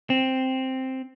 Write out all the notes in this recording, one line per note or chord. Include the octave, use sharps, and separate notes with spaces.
C4